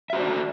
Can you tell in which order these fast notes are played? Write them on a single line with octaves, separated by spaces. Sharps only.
E5 F#4 C5 D5